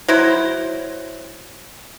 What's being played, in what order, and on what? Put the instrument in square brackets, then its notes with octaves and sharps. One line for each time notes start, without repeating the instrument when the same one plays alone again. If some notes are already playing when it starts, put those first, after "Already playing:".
[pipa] F#3 E4 C5